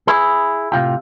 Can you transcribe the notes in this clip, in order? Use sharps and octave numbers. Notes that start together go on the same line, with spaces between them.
E4 G#4
A2 C3 F4 G4